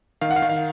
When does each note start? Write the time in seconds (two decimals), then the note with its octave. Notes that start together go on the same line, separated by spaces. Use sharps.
0.21 D#3 F5
0.31 F#5
0.36 F5
0.42 D#3
0.49 F5